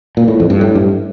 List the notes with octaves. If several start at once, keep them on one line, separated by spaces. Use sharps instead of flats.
A#2
A2
F2
G2
A2
G2